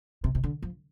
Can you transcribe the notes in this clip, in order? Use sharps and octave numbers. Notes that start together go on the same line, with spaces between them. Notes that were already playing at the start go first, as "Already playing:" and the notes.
C3
C3
D3
F3